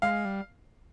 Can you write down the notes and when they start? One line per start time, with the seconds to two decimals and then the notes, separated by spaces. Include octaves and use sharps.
0.02 G#3 F5
0.25 G3